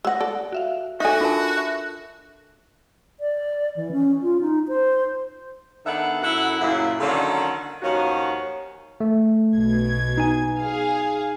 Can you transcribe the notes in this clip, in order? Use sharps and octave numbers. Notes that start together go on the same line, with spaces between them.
G#3 F#5 E6 A#6
A4 D5
F#4 E5 F5
D#4 F#4 A4 E5 G#5
D4 F4 A#4 E5 A5
E5
D5
E3
C#4
F4
D#4
C5
D#3 B3 D4 A4 E5 F#5
F#2 E4 A4 F#5
F#2 A#2 C#3 A#3 E4
D3 D#3 F#3 A#3 C#4 D4
D#2 D#3 F3 C#4 F#4
A3
B1 B2 G#6
D#4 G#5
G#4 F5